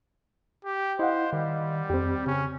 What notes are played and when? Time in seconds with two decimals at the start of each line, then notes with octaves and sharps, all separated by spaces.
0.65 G4
0.99 E4 C5 D#5 F5 F#5
1.33 D#3 G3
1.90 F2 C4 G4
2.27 C#3 C#4